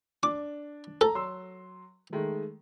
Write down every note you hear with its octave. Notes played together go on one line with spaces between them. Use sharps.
D4 D6
A4 A#5
F#3 C6 E6
D#3 G#3 A3